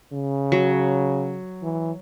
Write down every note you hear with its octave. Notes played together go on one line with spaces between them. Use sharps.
C#3
F#3
E3